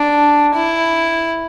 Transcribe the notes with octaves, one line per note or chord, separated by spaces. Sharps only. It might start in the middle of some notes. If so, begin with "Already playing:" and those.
Already playing: D4
E4